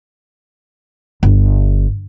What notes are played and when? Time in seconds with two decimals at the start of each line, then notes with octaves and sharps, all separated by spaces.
1.23 G1